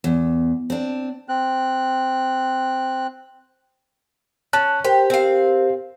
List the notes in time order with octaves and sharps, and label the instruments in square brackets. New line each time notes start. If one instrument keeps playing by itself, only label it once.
[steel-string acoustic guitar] E2
C4 D4
[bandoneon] C4 F#6
[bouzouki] C#4 [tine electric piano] A5 F#6
[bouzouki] G4 [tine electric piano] A#4 C5
[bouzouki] C4 F5 [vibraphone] G4